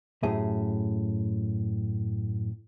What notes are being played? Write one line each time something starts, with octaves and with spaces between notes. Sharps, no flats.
F#2 A2 G4 G#4 E5